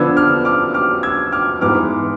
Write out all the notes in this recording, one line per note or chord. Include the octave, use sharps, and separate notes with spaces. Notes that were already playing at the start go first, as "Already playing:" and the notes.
Already playing: D3 F3 B3 D4 E6 G#6
D6 F6
D6 F6
D6 F6
E6 G#6
D6 F6
G#2 E3 B3 D6 F6